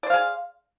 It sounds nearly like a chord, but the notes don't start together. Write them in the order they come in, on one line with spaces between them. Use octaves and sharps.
D5 C5 F5 G#4